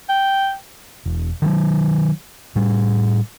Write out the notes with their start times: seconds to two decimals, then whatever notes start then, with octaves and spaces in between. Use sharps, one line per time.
0.09 G5
1.06 E1
1.42 D#3 E3 F#3
2.56 A2 G3